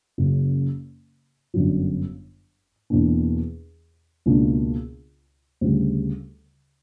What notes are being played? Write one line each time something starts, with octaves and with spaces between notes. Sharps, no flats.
F#1 F#2 C#3
G1 F#2 D3 F#3
E2 B2 A#3 D4
C#2 B2 A#3 D4
D2 C#3 G3